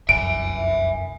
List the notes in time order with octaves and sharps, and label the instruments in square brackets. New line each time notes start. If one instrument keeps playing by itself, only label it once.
[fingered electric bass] F1 C2 F#2 [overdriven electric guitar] E5 G#5 [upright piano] D7